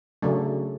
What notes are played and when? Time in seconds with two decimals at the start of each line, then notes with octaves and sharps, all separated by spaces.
0.22 C#3 F#3 A3 D4